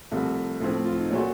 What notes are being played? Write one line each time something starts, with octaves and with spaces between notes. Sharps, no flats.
C2 C3 F3 A3
A2 F3 A3 C4
A3
F4
D#4
A#2 F#3 A3 C#4